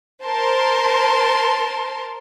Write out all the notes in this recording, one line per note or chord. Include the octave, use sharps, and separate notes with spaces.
A#4 C5 A5 C6